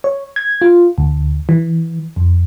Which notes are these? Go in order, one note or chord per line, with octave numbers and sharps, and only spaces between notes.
C#5
G#6
F4
D2
E3
F2